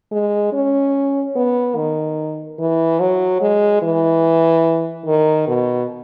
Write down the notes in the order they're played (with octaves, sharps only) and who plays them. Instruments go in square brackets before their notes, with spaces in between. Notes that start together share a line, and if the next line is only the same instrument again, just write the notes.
[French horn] G#3
C#4
B3
D#3
E3
F#3
G#3
E3
D#3
B2